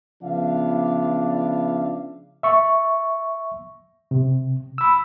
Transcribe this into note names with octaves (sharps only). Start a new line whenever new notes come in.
C#3 F3 B3 D4 E5 F5
E5 C#6
C3
B5 E6